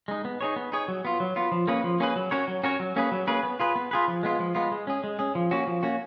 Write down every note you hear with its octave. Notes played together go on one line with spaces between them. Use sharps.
G#3 D#4
B3
D#4 G#4 C#5
B3
D#4 G#4 C#5
F#3
B3 F4
F#3
B3 F4
F3
A#3 C#4 G#4 B4
F3
A#3 C#4 G#4 B4
F#3
C#4 F#4 A#4 C#5
F#3
C#4 F#4 A#4 C#5
F#3
A#3 C#4 G#4 B4
F#3
A#3 C#4 G#4 B4
B3
F4 G#4 B4
B3
F4 G#4 B4
F3
G#3 B3 F4
F3
G#3 B3 F4
G#3
C#4 G#4
G#3
C#4 G#4
F3
A#3 C#4 F#4
F3
A#3 C#4 F#4